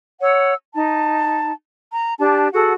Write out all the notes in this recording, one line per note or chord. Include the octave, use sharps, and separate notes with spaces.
C#5 F#5 E6
D#4 A5
A#5
D4 G4 A5
F#4 G#4 A4 F#5